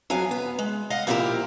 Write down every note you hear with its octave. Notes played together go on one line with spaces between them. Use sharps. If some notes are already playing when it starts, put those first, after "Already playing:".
F2 F#3 F5 G#5
B3
G#3
D#5 F5 F#5
A#2 F3 E4 F#4 G4 A#4